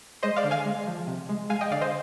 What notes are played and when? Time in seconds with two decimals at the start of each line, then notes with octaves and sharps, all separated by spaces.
0.23 G#3 C5 D#5
0.36 D5 F5
0.44 D3
0.51 F5 G#5
0.66 G#3
0.87 F3
1.07 C3
1.29 G#3
1.50 G#3 F5 G#5
1.61 D#5 G5
1.71 D3 D5 F5
1.81 C5 D#5